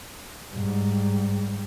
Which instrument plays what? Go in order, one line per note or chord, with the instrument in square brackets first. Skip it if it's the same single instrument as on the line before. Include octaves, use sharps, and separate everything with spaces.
[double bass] G#2 G3